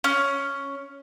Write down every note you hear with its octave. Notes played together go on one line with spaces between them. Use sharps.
C#4